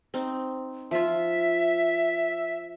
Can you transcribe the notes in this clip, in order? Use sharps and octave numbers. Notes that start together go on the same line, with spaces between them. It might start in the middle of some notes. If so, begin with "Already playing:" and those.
C4 D#4
F3 F4 E5